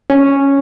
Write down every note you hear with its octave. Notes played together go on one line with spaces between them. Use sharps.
C#4